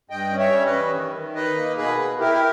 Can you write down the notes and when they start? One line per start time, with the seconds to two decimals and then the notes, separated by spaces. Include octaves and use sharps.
0.10 G2 D#5 G5
0.31 C#4
0.38 C#5 E5
0.52 G3
0.66 B4 D#5
0.73 E3
0.94 D#3
1.15 D#3
1.35 D#4 B4 D#5
1.56 A#3
1.77 B2 G#4 B4
1.98 B2
2.19 E4 G4 A#4